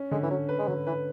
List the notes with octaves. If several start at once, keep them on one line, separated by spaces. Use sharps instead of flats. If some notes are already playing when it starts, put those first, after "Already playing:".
Already playing: C#4
D3 G#3
E3
F#3 C#4
B4
G#3
D3 F#3
E3 B4